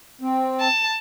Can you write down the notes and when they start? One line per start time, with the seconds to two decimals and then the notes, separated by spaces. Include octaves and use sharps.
0.21 C4
0.60 A5